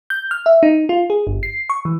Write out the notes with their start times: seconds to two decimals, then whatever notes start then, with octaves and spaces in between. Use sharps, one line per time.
0.10 G6
0.31 F6
0.46 E5
0.63 D#4
0.89 F4
1.10 G#4
1.27 G1
1.43 C7
1.70 C#6
1.85 E3